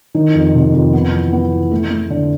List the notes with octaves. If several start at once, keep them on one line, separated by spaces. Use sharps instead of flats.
D#3
F2
C3
F2
B3
E3
B3
E3
A3
A3
D3